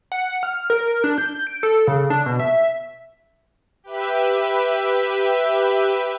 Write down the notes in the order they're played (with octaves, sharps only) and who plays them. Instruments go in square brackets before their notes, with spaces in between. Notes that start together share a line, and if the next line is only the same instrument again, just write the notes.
[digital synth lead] F#5
F6
A#4
D4
G6
D7
A4
C#3
D4
B2
E5
[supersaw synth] G4 B4 E5